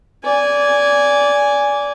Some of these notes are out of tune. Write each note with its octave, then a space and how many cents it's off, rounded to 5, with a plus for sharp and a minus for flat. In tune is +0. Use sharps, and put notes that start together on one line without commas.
D5 -20 G#5 -5